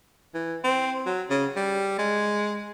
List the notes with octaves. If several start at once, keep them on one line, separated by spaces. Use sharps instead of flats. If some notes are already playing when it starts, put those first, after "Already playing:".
E3
C4
F#3
C#3
G3
G#3